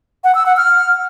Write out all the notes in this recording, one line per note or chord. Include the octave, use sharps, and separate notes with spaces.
F#5
E6
F#5
F6